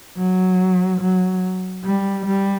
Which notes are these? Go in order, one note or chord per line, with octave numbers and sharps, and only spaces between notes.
F#3
F#3
G3
G3